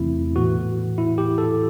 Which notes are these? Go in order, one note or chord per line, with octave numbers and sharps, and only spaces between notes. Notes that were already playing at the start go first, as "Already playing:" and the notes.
Already playing: E2 C3 E3 A3 C4 E4
A2 E3 B3 F#4
E4
G4
A4